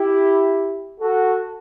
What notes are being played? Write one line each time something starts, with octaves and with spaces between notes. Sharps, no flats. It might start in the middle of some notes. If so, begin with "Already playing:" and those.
Already playing: E4 G4
F#4 A4